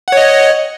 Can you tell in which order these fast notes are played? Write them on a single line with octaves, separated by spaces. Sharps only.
F#5 C#5 D#5